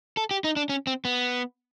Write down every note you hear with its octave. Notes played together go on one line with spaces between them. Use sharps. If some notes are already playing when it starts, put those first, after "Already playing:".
A4
G4
D#4
D4
C#4
C4
B3